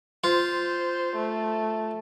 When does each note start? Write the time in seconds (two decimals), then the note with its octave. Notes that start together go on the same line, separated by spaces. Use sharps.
0.24 F4 C5
1.16 A3